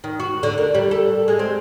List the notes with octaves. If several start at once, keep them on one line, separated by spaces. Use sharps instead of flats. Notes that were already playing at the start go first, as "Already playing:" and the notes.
D#3
F#4
D3
A#4
G3
A4
G#3
C4